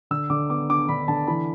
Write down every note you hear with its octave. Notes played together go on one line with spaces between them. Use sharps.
D3 E6
D3 D6
B3 D6
D4 D6
D3 B5
D3 A5
E3 B5